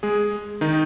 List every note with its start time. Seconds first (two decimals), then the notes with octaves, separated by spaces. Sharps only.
0.03 G#3 G#4
0.61 D#3 D#4